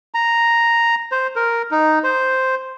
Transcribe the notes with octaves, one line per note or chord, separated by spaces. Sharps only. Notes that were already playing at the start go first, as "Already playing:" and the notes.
A#5
C5
A#4
D#4
C5